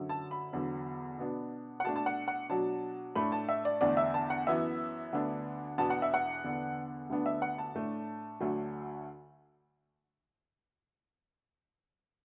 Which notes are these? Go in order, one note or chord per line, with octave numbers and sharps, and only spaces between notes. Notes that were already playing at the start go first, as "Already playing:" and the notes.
Already playing: F#2 D3 F#3
A5
B5
E2 D3 F#3
B2 B3 D4
F#5
B2 A3 D4 A5
A5
F#5
F#5
B2 F#3 D4 A5
A2 A3 D4 B5
A5
E5
D5
E2 D3 A3 D4 D5
E5
A5
F#5
F#2 E3 B3 E5
D2 D3 B3 D4
E2 B2 B3 D4 A5
F#5
E5
F#5
E2 D3 B3 D4
D2 D3 B3 D4
E5
F#5
A5
A2 A3 D4
D2 D3 F#3 A3 D4